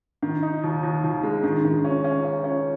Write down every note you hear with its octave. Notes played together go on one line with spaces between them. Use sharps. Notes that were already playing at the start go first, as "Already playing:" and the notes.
D#3
D#4
D#2
D#2
D#2
G#3
D#3
D#3
C#4
C#4
C#4
C#4